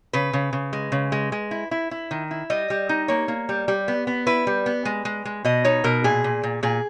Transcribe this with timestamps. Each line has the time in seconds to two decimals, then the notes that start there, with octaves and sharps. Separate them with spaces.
0.13 C#3 B4
0.33 C#3
0.53 C#3
0.73 G#3
0.92 C#3
1.12 G#3
1.32 G#3
1.51 E4
1.71 E4
1.91 E4
2.11 D#3
2.31 E4
2.50 G3 D#5
2.70 G3
2.89 D#4
3.08 A#3 C#5
3.28 A#3
3.49 G3
3.68 G3
3.88 B3
4.07 B3
4.26 E4 B4
4.47 G3
4.66 B3
4.85 G#3
5.05 G#3
5.25 G#3
5.44 B2 D#5
5.65 D#4 C#5
5.84 B2 A#4
6.04 A#2 G#4
6.24 A#2
6.43 A#2
6.63 A#2 G#4